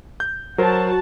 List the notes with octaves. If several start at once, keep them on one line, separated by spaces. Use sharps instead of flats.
G6
F#3 F#4 A#4 C5 A5